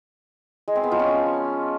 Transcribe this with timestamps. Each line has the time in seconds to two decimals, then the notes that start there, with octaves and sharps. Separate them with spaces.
0.68 G#3
0.76 C4
0.84 B3
0.91 F3
0.99 C#4